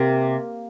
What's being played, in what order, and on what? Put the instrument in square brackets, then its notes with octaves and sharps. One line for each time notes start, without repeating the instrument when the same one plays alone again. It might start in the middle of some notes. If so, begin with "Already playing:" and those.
Already playing: [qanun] C3 A#3